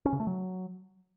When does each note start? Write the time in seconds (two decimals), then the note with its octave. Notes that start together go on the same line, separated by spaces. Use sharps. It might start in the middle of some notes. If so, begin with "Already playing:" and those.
0.05 C#4
0.13 C#3
0.20 A3
0.27 F#3